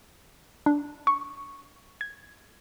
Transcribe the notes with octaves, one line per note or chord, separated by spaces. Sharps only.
D4
C#6
G#6